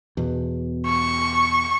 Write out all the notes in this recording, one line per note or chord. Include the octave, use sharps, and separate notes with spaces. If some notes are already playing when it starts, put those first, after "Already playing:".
E2 B2
C#6